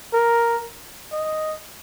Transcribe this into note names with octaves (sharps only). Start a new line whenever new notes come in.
A#4
D#5